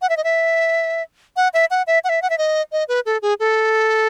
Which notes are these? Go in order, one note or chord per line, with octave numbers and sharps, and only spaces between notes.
F#5
E5
D#5
E5
F#5
E5
F#5
E5
F#5
E5
F#5
E5
D#5
D#5
B4
A4
G#4
A4